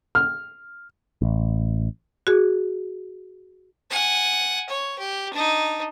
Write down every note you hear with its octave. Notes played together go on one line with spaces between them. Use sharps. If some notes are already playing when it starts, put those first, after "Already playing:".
F6
A1
F#4 G#4
F#5 G#5
C#5
G4
D4 D#4